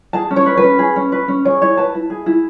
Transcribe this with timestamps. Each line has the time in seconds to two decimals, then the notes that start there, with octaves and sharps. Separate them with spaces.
0.13 G#4 A5
0.31 C#4
0.36 C#5
0.46 B4
0.57 B4
0.64 C#4
0.79 G#4
0.96 C#4
1.12 B4
1.28 C#4
1.45 G#4 C#5
1.62 E4 C#5
1.77 B4 A5
1.95 E4
2.10 G#4
2.26 E4